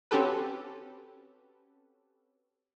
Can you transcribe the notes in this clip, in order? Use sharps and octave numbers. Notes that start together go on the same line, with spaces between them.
C4 C#4 F#4 G4 A4 B4